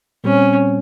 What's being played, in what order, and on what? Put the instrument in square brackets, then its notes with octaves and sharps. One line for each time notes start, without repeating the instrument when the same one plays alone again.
[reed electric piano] A#2 G3 C4 [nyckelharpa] C#4